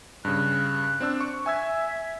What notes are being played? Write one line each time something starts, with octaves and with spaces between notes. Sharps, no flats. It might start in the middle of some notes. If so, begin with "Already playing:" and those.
G2 C#3 F#6
C4 D4 E6
C#6
E5 G#5 E6 G#6